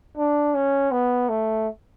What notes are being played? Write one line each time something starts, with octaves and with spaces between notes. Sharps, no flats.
D4
C#4
B3
A3